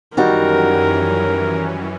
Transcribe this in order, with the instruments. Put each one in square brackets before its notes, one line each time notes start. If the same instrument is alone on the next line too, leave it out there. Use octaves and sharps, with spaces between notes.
[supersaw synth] F#2 E3 C#4 [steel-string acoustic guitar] D#3 G3 F#4 [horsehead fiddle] A#4